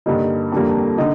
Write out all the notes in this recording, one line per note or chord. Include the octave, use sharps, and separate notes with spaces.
G2 D3 G3 A#3 D#4
F2 D3 G3 A#3
D3 D#4